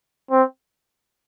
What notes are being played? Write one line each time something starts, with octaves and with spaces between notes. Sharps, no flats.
C4